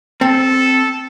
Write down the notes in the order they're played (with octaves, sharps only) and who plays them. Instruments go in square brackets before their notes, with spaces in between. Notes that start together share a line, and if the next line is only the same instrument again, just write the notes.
[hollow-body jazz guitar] C4 [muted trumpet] A4